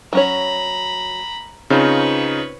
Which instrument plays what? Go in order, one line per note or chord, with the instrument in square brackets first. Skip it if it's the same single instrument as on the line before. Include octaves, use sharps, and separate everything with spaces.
[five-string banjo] F#3 C#4 C#5 [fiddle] A#5 B5
[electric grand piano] C#3 D#4 F4 [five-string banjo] C4 [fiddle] B4 C#5